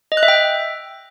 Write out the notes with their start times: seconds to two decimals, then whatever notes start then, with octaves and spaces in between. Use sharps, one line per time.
0.12 D#5
0.17 F#6
0.23 E5
0.28 G5